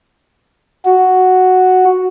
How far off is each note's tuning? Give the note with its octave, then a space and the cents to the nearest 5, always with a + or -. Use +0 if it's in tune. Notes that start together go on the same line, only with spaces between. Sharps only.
F#4 +0